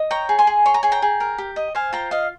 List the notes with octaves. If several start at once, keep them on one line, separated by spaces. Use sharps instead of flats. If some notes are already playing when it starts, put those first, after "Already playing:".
Already playing: D#5
C#5 G5 A#5
G#4
G#5 C6
G#4
C#5 C6
A#5
G#4 G#5
G5 A#5
G#4
A#4
G4
D#5
C5 F5 G#5
F4 G5 A#5
D#5 F5